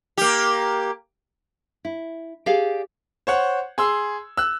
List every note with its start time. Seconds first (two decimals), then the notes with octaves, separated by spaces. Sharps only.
0.17 A#3 G4
1.85 E4
2.46 G4 G#4 D5 F5
3.27 C5 C#5 F#5
3.78 G#4 C6 E6
4.37 E6 F#6